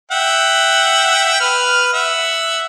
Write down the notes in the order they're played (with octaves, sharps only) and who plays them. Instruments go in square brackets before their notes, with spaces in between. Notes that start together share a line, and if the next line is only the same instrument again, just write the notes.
[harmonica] E5 F#5 G5
B4 F6
E5 F#5